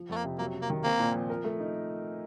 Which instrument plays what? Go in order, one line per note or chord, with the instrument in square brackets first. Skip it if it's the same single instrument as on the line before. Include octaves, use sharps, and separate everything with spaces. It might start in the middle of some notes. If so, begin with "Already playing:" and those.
Already playing: [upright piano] F3
[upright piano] F2 [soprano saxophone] A3
[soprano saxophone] A#3
[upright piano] C3
[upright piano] F#3 [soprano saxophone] A#3
[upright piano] C3
[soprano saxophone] A#3
[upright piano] D#3
[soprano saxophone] A#3 [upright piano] C4
[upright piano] A#2
F3
A#4
A3
D#4